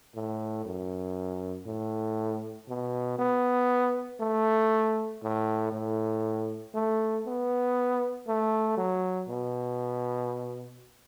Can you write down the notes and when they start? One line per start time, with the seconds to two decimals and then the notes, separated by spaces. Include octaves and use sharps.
0.15 A2
0.65 F#2
1.66 A2
2.68 B2
3.19 B3
4.20 A3
5.22 A2
5.72 A2
6.74 A3
7.26 B3
8.27 A3
8.77 F#3
9.29 B2